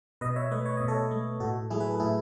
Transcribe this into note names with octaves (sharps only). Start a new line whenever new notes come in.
B2 B4 D#5
C#5 E5
A3 B4 D#5
C#5
B2 D#5
A4 C#5
A3
A2 F#4 A4
F#3 A3 E4 G#4
B4
A4
A2 E4 G#4